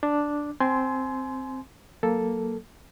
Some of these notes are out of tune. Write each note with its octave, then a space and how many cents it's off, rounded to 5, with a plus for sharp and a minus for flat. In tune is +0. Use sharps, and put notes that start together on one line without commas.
D4 +0 D6 +0
C4 +0 G#5 +30 C6 -10
F#3 +5 A#3 +0 A4 +0